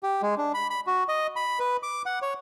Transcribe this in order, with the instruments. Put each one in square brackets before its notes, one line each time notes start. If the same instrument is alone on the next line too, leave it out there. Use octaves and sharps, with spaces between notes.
[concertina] G4
G#3
D4
B5
B5
F#4
D#5
B5
B4
D6
F#5
C#5